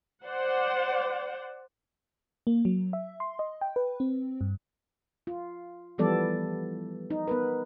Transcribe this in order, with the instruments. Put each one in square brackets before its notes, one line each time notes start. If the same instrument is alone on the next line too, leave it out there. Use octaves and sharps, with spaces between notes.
[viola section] C5 D5 F#5
[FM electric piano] A#3
F#3
E5
C6
D#5
G5
B4
C4
G2
[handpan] F4
E3 F3 G3 B3 A4 D5
D#4
B3 A#4 B4